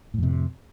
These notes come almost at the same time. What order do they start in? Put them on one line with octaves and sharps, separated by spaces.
A2 F2 C3